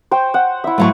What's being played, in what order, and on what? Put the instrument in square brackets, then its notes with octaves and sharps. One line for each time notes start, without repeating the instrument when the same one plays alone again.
[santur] C5 G5 C#6
F#5
E4 E5
[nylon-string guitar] A2 F#3 A3 [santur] F5 C#6